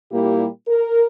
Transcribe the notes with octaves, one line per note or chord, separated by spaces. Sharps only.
A#2 G3 A#3 E4 G4
A#4